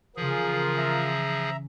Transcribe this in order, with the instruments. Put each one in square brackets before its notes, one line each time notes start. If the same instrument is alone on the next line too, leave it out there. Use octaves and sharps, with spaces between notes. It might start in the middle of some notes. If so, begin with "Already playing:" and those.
[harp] C#3 E3 [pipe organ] F3 G#4 [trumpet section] F4 A#4
[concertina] E5 A#5